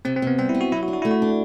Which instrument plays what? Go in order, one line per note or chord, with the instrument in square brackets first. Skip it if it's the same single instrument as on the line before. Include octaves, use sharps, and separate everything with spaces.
[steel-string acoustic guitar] C3 [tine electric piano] C4
[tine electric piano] C4
[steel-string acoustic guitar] C3 [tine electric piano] B3
[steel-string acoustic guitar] G3 [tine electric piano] C4
[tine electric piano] E4
[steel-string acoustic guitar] B3
[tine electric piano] F#4
[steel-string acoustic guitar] F#3 [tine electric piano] E4
[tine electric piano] F#4
[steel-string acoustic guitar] D4
[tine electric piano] F#4
[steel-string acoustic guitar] A3 [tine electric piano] E4
[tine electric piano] F#4
[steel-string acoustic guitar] D4